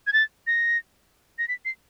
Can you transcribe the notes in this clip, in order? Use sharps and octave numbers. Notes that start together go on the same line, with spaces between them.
G#6
A6
A#6
A#6
B6
C7